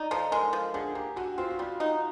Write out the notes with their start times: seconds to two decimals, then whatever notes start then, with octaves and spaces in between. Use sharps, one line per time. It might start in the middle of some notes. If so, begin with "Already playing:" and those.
Already playing: D#4 D5 D#5
0.11 F3 A4
0.32 G#3 A#4
0.53 F3
0.74 D3 G#4
0.95 A#3 G4
1.16 D3 F#4
1.38 C4 F4
1.51 F#4
1.59 G3 F4
1.80 D#4